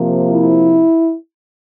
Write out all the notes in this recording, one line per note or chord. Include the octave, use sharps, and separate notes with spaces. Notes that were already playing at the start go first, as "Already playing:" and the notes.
Already playing: C3 F3 A#3
E4